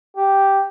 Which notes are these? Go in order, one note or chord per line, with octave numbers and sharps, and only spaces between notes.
G4